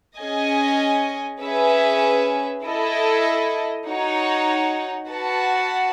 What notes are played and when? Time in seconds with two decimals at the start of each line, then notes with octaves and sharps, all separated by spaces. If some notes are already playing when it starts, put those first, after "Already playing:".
0.19 C#4 G#4 D#5 G#5
1.42 C#4 G#4 B4 E5
2.64 E4 A4 D#5
3.87 D#4 F#4 C#5 F#5
5.10 F#4 B4 F#5 A5